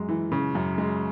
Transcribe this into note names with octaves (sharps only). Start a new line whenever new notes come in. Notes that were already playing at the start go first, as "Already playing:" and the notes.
Already playing: F#2 G#3
E3
C#3
F#2
G#3